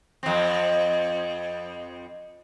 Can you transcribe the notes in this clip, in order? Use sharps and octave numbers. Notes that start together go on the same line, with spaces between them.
F2 C4